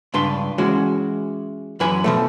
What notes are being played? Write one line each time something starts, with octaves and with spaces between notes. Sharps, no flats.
C#2 G2 D4 B4 C6
E3 G#3 C#4 F#4
F#2 E3 B4 G#5
B2 F3 A3